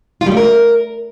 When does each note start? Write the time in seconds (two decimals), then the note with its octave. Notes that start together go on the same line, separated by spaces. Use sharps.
0.21 F4
0.26 G3
0.32 A3
0.37 A#4